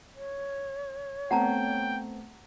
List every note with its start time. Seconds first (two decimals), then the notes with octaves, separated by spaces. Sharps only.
0.15 C#5
1.31 A3 B3 C4 F#5 G5 A5 A#5